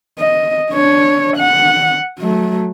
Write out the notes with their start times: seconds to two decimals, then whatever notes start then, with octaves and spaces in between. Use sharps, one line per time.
0.19 D#5
0.71 D4 C#5
1.37 F#5
2.20 F#3 A3